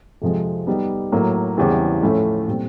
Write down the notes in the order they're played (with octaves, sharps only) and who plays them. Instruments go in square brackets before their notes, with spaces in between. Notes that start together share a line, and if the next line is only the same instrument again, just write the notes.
[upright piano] F2 C3 F3 G#3
G3 B3 D#4
A2 F#3 A#3
E2 C#3 E3 G3 C4
A2 F3 A3 C#4 E4
A#2 G3 C4